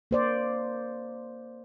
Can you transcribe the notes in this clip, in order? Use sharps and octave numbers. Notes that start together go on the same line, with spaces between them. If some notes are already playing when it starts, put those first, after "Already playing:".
A#3 C5 D5